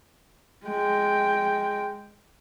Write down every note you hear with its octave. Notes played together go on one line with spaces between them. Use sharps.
G#3 G5